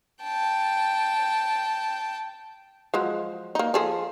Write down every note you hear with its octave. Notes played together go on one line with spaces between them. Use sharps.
G5 A5
F3 F#3 G#3
A#3 D#4
F3 G#4 A4